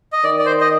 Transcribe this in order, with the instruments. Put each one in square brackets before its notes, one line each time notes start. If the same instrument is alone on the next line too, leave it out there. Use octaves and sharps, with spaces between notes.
[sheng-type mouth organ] D#5
[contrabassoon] D#3 [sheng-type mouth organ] D5
[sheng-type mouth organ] D5
C5
D#5